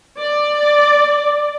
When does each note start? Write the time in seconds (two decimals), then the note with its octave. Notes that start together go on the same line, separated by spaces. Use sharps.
0.18 D5